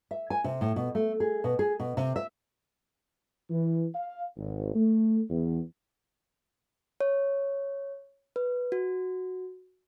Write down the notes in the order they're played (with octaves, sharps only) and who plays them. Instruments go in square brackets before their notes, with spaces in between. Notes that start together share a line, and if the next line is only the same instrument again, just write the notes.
[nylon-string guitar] E5
G#5
C3
A2
B2
A3
G#4
B2
G#4
B2
C3
E5
[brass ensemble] E3
F5
G#1
A3
E2
[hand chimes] C#5
B4
F#4